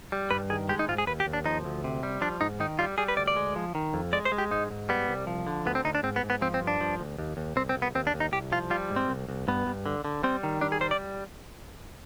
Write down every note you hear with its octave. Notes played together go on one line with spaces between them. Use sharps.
G3
G2 B4
D#3 G#4
G#3 G4
D#4
G#2 F4
G#4
D#2 B4
G4
D#2
D4
F3 D#4
D2
C3
G3
F3 D4
G#2 D#4
D#3 D#4
G3 F4
G3 G#4
B4
D2 D5
D5
G#3
F3
D#3
F2
G#3 D5
C5
G#3
G4
G#2 D#4
G#2
G3 B3
C2
F3
D3
D2 B3
C4
D2 D#4
D4
G#2 C4
B3
G#2
B3
F3 C4
C4
G2
D4
F3
D2
D#2
D#2
C2 C4
C4
C2
B3
D#2 C4
D4
D#2
D#4
C2 G4
F3 F4
G3 F4
G#2
C4
C2
C2
G2 B3
G2
D3
D3
G3 C4
D#3
G3 D4
G#4
G3 C5
D5